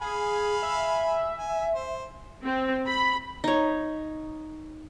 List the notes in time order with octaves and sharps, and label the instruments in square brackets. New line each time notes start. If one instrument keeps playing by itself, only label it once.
[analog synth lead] G#4 [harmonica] F5 G#5 B5
[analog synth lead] E5
[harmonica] G#5
C5
[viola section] C4
B5
[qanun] D#4 C#5